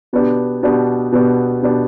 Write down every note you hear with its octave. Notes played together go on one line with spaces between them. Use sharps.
B2 B3 D4 G4
B2 B3 D4 G4
B2 B3 D4 G4
B2 B3 D4 G4